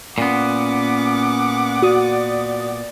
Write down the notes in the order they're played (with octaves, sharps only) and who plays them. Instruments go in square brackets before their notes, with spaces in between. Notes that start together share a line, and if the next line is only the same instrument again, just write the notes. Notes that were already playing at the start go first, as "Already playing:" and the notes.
[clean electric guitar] A#2 B3 [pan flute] C#4 [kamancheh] F#5 D6
[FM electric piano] F#4 D#6 [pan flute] D5